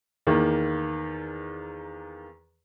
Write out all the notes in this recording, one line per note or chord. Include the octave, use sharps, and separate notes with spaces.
E2 D#3 A#3